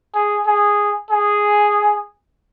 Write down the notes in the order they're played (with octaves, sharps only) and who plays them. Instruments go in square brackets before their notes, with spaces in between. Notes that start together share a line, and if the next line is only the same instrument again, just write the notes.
[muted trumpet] G#4
G#4
G#4